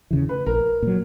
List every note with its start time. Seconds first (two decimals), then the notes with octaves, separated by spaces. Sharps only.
0.11 E2 C#3 E3
0.29 B4
0.46 A#1 A#4
0.83 A#2 F#3